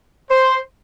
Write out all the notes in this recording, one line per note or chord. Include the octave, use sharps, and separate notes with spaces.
C5